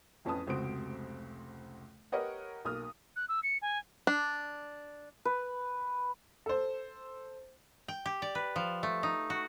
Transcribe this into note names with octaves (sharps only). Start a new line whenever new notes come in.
A1 F2 C#4 B4 A5 D#6
F1 C#2 C4 F#4 C5 D7
G4 A#4 B4 C#5 D#5 F#5
B1 A#3 D#6 F6
F#6
E6
C#7
G#5
D4
B4
A4 C5
G5
G4
D5
B4
F3
A3
D#4
F#4